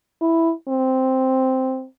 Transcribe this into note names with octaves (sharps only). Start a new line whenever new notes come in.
E4
C4